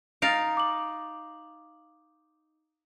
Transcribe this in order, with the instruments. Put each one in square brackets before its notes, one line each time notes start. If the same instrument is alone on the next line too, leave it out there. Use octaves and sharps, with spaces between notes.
[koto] D#4 F5 [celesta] A6 A#6 D7
[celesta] D6 F#7